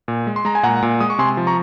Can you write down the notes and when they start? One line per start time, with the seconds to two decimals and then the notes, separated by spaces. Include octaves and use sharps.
0.08 A#2
0.27 G#3
0.36 C6
0.45 G#3 A#5
0.55 G#5
0.63 A#2 F#5 A#5
0.82 A#2
1.00 G#3 D#6
1.10 C#6
1.18 C3 G#5 C6
1.37 F3
1.47 A#5 C#6